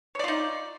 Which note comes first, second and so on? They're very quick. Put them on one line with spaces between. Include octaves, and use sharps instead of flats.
C#5 D5 F4 D#4